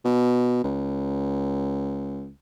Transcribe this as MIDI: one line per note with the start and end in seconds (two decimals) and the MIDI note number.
0.05 0.63 47
0.64 2.30 37